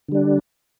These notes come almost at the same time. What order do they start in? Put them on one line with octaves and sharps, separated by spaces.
D3 G3 D4